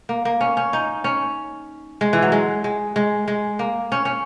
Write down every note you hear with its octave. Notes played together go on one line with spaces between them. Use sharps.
A#3
A#3
C#4
C#4
D#4
C#4
G#3
E3
F#3
G#3
G#3
G#3
G#3
A#3
C#4
C#4